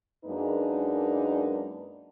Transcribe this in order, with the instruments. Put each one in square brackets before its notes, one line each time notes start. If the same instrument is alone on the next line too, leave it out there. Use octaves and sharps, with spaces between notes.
[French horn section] F#2 G#3 A#3 D4 D#4 B4